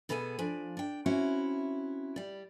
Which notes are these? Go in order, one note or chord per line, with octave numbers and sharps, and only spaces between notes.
B2 B3 G#4 A4 D5 G#5
F3 D4 G#5
D4 G5
C4 C#4 E4 F#4
G3 D5